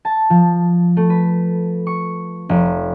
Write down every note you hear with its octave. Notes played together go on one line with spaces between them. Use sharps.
A5
F3
A3
B4
C#6
F1